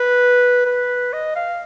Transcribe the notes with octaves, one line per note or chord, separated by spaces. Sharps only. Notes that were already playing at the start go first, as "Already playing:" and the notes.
Already playing: B4
B4
D#5
F5